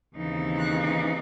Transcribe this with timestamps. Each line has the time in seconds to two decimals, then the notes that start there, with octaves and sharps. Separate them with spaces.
0.18 D#2 C#3 E3 C4 D#4
0.58 F#6